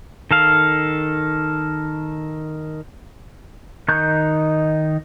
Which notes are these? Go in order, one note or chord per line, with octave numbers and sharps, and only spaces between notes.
D#3 A4 F5
D#3 D#4 C#6 F#6 G6